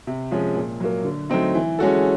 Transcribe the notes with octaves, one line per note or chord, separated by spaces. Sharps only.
C3
F3 G#3 C#4
A#2
F#3 A#3
D3
F#3 A3 C4 D#4
E3
G#3 C#4 F#4 A4